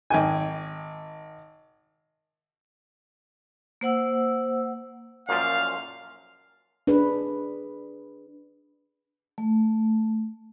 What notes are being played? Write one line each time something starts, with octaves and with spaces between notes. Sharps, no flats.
G#1 G5 G#5
A#3 C5 F#5 E6
F#2 A#2 F3 F5
D4 G#4 B4
A3